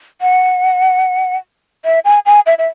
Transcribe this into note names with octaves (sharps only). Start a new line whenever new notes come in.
F#5
E5
G#5
G#5
E5
E5